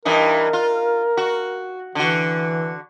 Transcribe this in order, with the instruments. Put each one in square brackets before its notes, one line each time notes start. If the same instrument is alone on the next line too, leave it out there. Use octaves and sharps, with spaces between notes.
[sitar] G2 E3 D#4 [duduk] A#4
[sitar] F4
F#4
[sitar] D3 F#4 [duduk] E3